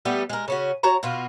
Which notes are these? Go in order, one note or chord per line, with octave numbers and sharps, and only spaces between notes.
G3 A3 B3 G4
G#3 A#4
C#3 C#4 F#4
F#4 C#5 A5 A#5
B2 F4 F#4